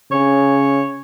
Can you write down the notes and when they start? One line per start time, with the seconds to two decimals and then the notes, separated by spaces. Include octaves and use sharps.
0.11 C#3 C#5